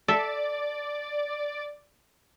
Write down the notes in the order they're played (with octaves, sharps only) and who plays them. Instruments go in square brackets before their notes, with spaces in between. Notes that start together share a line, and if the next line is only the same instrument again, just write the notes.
[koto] A4 E5 [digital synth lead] D5